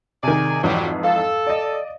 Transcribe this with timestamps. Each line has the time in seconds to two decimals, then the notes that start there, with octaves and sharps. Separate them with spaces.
0.23 C3 D#3 G#4 D5 G#5
0.64 F2 G#2 E3 F#3 G3
1.03 A4 F5
1.47 D5 D#5